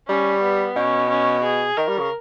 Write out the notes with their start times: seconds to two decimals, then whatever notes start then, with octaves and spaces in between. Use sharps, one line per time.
0.08 G3 C#4
0.43 B3
0.76 B2 C#4
1.10 C#4
1.44 G#4
1.77 D#3 A#4
1.88 G3
1.99 C#3